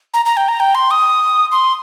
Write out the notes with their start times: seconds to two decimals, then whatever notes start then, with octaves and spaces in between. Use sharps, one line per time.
0.14 A#5
0.25 A#5
0.37 G5
0.48 A#5
0.60 G5
0.75 C6
0.91 D#6
1.52 C6